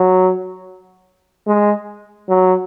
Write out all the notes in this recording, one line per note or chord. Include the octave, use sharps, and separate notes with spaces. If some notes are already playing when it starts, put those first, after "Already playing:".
Already playing: F#3
G#3
F#3